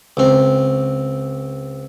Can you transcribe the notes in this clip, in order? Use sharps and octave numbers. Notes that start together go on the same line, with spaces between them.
C#2 C4